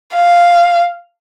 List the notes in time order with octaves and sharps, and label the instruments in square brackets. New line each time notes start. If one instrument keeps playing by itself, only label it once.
[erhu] F5